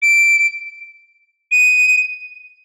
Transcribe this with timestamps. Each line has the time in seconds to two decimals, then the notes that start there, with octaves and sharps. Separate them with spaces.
0.02 D7
1.52 D#7